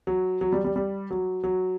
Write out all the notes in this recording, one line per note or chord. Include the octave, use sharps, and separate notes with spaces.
F#3
F#3
G3
G3
G3
F#3
F#3